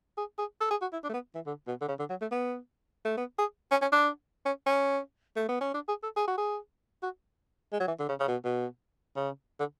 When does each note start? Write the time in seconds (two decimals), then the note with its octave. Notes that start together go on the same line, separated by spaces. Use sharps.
0.18 G#4
0.38 G#4
0.61 A4
0.71 G#4
0.82 F#4
0.93 E4
1.04 D4
1.10 A3
1.14 B3
1.35 E3
1.46 D3
1.67 B2
1.81 D3
1.88 C#3
1.99 D3
2.10 F#3
2.21 A3
2.32 B3
3.05 A3
3.18 B3
3.39 G#4
3.71 C#4
3.82 C#4
3.92 D4
4.46 C#4
4.66 C#4
5.36 A3
5.49 B3
5.61 C#4
5.74 D4
5.88 G#4
6.03 A4
6.17 G#4
6.28 F#4
6.38 G#4
7.03 F#4
7.73 G#3
7.80 F#3
7.88 E3
7.99 D3
8.09 C#3
8.20 C#3
8.28 B2
8.45 B2
9.16 C#3
9.60 D3